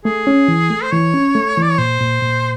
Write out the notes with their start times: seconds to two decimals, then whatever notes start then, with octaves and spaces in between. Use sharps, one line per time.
0.05 A3 G#4
0.27 C#4
0.48 E3
0.70 A3
0.83 C5
0.92 E3 C#5
1.14 C#4
1.35 A3
1.57 E3 D5
1.70 C#5
1.78 A#2 C5
2.01 A#2
2.22 A#2